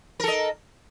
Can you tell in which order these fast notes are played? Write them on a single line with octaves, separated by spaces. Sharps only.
A#4 A4 D#5